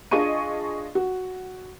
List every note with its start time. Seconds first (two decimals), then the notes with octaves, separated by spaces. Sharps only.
0.11 D4 F4 G#4 D#5 C#6 D#7
0.95 F#4